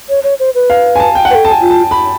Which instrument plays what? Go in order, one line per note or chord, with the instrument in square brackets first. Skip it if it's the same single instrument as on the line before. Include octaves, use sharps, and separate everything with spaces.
[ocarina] C#5
C#5
C5
B4
[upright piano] F5
G#5
A5
G5
F#5
[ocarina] A4 B4 [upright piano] G5
[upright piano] A5
G#5
[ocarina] F4
[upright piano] A5
B5